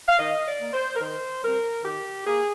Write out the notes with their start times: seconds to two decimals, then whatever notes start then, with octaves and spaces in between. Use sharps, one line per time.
0.08 F5
0.18 D#3 D#5
0.47 D5
0.61 A#3
0.73 C5
0.95 A#4
1.01 D#3 C5
1.43 G3 C4 A#4
1.84 D#3 G4
2.26 A#3 G#4